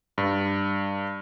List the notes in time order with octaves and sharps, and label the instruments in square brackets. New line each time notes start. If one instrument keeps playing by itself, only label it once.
[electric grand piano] G2